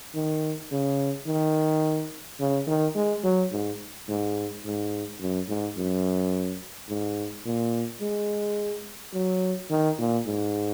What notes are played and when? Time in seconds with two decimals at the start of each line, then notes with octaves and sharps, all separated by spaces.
0.15 D#3
0.72 C#3
1.27 D#3
2.40 C#3
2.67 D#3
2.95 G#3
3.24 F#3
3.52 G#2
4.09 G#2
4.65 G#2
5.21 F#2
5.49 G#2
5.77 F#2
6.89 G#2
7.46 A#2
8.02 G#3
9.14 F#3
9.70 D#3
9.98 A#2
10.26 G#2